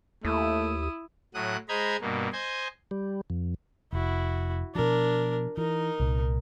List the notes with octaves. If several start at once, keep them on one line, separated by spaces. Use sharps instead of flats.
D#2 A3 E4 D#6
A2 F#3 D#6 F#6
G#3 C5 D#5 A#5 B5 G#6
G2 B2 A#3
C5 D#5 G#5
G3
F2
F1 E4 F#4
B2 F3 D4 A#4
E3 D#4 A#4
C2 A#2